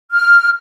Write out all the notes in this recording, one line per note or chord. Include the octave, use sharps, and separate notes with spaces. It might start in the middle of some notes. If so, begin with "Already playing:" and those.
F6